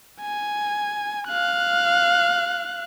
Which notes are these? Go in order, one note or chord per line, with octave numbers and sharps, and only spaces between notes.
G#5
F5 F#6